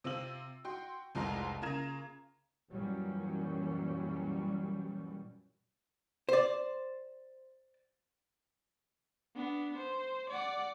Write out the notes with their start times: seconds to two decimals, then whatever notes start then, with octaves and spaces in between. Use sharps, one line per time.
0.04 C3 C4 F4 E6 F#7
0.65 F#4 G5 C6
1.15 F1 C2 F3 G#3 A#5 C6
1.62 C#3 A#3 F4 A#5 G#6 E7
2.69 F#2 A#2 E3 F#3 G3 C#4
6.29 C5 D5
9.35 B3 D4
9.77 C5
10.30 D5 F#5